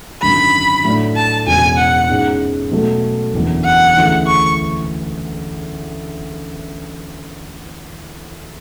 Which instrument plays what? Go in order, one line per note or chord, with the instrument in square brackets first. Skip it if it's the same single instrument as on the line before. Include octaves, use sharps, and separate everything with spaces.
[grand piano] G#1 F#2 D3 [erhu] B5
[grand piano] A2 F#3 A3 D4
[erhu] A5
[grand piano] E1 E2 C#3 [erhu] G#5
[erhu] F#5
[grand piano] G#2 G#3 C#4
B2 F#3 A3
F#1 E2 D3
[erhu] F#5
[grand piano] D2 C#3 E3
[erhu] C#6